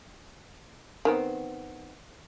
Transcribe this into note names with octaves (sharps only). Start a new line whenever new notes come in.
D#3 B3 C4